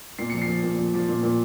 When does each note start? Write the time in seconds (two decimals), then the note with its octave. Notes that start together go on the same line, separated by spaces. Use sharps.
0.19 A#2 C7
0.30 F3 C#7
0.42 C7
0.48 F3
0.63 A#2
0.79 F3
0.94 F3
1.09 A#2
1.23 A#2